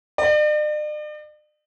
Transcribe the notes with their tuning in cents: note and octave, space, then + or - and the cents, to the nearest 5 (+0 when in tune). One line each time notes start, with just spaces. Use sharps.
D5 +45